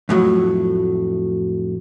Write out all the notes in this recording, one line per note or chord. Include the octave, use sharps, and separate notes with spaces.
F2 A2 F#3